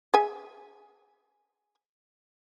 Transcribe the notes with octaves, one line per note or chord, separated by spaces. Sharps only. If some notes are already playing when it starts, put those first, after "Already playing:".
G#4 E5 G#5